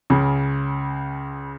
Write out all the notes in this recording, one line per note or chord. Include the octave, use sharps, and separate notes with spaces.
C#2 C#3